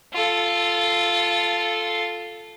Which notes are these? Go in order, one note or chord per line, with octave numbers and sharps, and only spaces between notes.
F4 A4